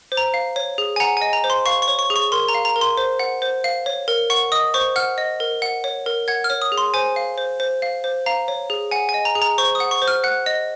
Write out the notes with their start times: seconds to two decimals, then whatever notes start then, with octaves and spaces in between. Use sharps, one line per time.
0.12 C5
0.17 A#5
0.34 F5
0.56 C#5
0.78 G#4
0.96 G#5
1.00 F#5 A#5
1.17 G#5
1.22 D#5
1.33 A#5
1.44 C5
1.50 C6
1.66 F5 C#6
1.82 C#6
1.88 C#5
1.99 C#6
2.10 G#4
2.16 C#6
2.32 A#4 C6
2.49 A#5
2.55 F5
2.65 A#5
2.76 A#4
2.81 C6
2.97 C5
3.19 F#5
3.42 C5
3.64 F5
3.86 C#5
4.08 A#4
4.30 F#5 C#6
4.52 D#5 D#6
4.74 C5 C#6
4.96 F#5 F6
5.18 D#5
5.40 A#4
5.62 F#5
5.84 C#5
6.06 A#4
6.28 F#5 G#6
6.44 F6
6.50 C#5
6.62 D#6
6.72 G#4
6.78 C6
6.94 C5 G#5
7.16 F5
7.38 C5
7.60 C5
7.82 F5
8.04 C5
8.26 F5 A#5
8.48 C#5
8.70 G#4
8.91 F#5 G#5
9.09 G#5
9.14 D#5
9.25 A#5
9.35 G#4
9.42 A#5
9.58 C5 C#6
9.75 D#6
9.80 F#5
9.91 C#6
10.02 C5
10.08 F6
10.24 F#5 F#6
10.46 D#5